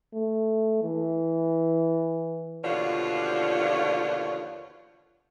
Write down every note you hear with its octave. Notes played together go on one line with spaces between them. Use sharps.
A3
E3
D#2 B2 D3 F3 F4 C#5